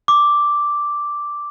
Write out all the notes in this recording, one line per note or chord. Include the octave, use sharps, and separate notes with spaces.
D6